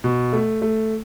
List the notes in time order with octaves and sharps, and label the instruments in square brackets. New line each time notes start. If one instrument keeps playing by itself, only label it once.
[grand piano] B2
A3
A3